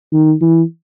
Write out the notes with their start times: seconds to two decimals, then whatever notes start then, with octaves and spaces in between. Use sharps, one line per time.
0.13 D#3
0.42 E3